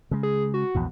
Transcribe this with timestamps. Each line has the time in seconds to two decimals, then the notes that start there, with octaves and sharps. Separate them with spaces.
0.11 C#3 G#3
0.23 G#4
0.54 F#4
0.75 A#1 E2 G#2